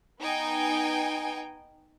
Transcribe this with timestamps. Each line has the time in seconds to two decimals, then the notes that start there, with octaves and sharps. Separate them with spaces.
0.22 B3 D#4 G5 G#5